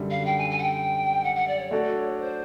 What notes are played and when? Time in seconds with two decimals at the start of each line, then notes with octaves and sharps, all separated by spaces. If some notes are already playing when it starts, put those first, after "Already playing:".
Already playing: F#2 D3 G3
0.10 F5
0.26 G5
0.38 G#5
0.51 G#5
0.59 F#5
0.62 G5
1.24 F#5
1.35 F#5
1.48 D5
1.59 C#5
1.71 A3 D4 F#4 A4 D5
2.20 C5